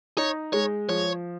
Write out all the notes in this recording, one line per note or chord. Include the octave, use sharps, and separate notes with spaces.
D#4 C#5
G#3 C#5
F3 C#5